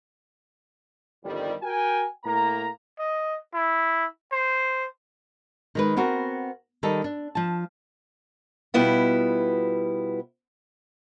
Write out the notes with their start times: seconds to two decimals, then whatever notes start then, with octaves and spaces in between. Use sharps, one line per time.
1.23 G1 F2 D#3 G3
1.62 F#4 A#4 G5 G#5
2.24 A2 A#3 A#5
2.99 D#5
3.54 E4
4.33 C5
5.75 D#3 G#3 B4
5.97 B3 C4 F#4 A#4
6.83 D#3 G3 D#4 A4
7.04 D4
7.35 F3 A5
8.74 B2 G3 B3 E4 F4